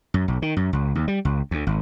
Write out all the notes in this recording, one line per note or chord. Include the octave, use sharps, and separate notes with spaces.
F#2
B1
D#3
F#2
C#2
D#2
G3
C#2
D2
G#1